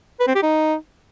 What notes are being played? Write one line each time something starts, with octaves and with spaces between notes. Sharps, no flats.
B4
C4
G4
D#4